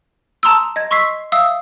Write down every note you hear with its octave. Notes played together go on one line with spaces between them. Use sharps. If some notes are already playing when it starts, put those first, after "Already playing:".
A5 A#5 C6 D#6 E6
D#5 G#6
C6 C#6 E6 B6 C7
E5 F5 D#6 E6